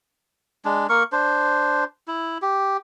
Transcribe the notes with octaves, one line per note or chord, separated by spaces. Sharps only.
G#3 D4
A#3 A#4 C#6
D4 C5
E4
G4